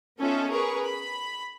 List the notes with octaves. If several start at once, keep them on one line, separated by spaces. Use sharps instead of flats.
B3 C#4 D#4 F4 A4 E5
G#4 A#4 B4 C#6
B5